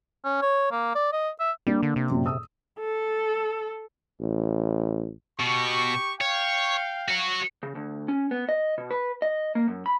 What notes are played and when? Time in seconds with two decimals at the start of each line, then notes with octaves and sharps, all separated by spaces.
0.25 C#4
0.42 C#5
0.71 A#3
0.95 D5
1.13 D#5
1.40 E5
1.67 G3 A#3 D4
1.83 D3
1.96 C3
2.10 F#2 A#2
2.26 D#6 E6
2.80 A4
4.21 A1
5.40 B2 G4 C#6
6.21 C#5 F5 G5
7.08 F#4 C#5
7.63 C#3
7.75 D2
8.08 C#4
8.31 B3
8.49 D#5
8.78 B2
8.91 B4
9.22 D#5
9.55 A#3
9.67 F#2
9.86 B5